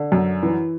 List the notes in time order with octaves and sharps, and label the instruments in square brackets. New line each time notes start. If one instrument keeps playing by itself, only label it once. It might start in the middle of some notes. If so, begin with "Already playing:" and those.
Already playing: [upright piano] D3
F#2
E3